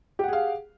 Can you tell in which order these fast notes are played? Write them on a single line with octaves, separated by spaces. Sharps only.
G4 F#5 G#4 F5